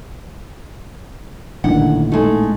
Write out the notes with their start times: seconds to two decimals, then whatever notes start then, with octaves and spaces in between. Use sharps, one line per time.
1.64 A1 A#2 D3 D#3 D4 F#5
2.12 G#3 A3 D#4 A4